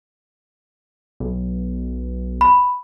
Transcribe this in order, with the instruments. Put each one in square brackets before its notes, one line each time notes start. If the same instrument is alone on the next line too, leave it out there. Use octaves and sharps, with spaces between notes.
[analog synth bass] B1
[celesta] B5